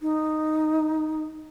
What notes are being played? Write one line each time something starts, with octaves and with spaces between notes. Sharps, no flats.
D#4